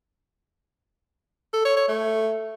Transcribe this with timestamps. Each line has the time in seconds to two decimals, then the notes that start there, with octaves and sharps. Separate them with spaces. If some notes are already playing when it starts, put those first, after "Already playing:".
1.53 A4
1.65 C#5
1.77 C#5
1.88 A3